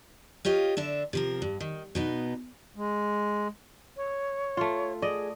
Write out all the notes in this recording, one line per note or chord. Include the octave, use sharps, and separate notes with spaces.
F4 G4 C#5 D#5 F5
D3 D4 E5
C3 F3 A#4
G2
D#3
B2 B3 D#4
G#3
C#5
A3 F4
G#4 D5 D#5